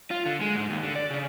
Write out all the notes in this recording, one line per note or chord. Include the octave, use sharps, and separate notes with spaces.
F4
D3
G#3
G#2
D#2
D3
D5
C#3